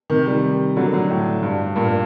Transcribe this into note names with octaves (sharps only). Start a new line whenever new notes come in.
C3 D#3
D#3 G3
D3 F#3
D3 F#3
A2
G2
G2 A#2
A#2